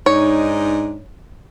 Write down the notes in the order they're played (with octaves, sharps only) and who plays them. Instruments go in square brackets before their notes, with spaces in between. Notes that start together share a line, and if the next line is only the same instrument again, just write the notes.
[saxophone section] G#2 D4 D#4 [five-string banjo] C#5